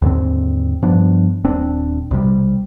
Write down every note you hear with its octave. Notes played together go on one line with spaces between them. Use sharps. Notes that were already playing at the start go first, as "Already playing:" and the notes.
D#2 G#2 D3 C4
G2 F3 B3 D4
D#1 C4 D4
B1 C3 G3